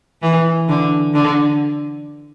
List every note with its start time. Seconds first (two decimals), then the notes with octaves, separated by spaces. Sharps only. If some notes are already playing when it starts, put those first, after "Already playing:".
0.22 E3
0.68 D3
1.14 D3